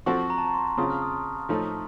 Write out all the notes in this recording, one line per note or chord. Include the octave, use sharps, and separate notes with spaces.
F3 C4 F#4 A4 C#6
A#5
A5
A#5
C6
C#3 F#3 C4 F4 D#6
F6
D#6
A2 F3 A3 D#4